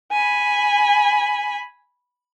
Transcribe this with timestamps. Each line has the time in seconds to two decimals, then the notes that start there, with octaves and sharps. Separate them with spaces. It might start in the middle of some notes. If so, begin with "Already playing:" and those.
0.12 G#5 B5